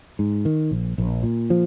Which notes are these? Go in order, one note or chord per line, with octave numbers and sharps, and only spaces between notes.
G#2
D#3
A#1
A#1
A#2
F3